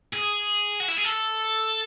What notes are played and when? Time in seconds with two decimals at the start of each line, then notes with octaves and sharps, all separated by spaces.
0.13 G#4
0.80 F#4
0.88 E4
0.97 G#4
1.05 A4